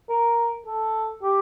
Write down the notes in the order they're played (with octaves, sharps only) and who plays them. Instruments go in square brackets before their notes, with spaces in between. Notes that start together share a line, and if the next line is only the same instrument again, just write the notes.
[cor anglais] A#4
A4
G4